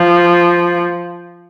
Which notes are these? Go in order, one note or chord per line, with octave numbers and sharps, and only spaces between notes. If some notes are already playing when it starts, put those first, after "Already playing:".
Already playing: F3